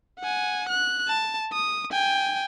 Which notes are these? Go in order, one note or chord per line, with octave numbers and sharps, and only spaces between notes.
F#5 G#5
F#6
A5
D#6
G5 G#5